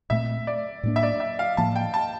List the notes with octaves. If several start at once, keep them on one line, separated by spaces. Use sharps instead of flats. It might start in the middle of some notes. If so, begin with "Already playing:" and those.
A#2 A3 C4 E5
D5
A2 G3 A#3 D4
E5
D5
E5
F5
A2 F3 A#3 A5
G5
A5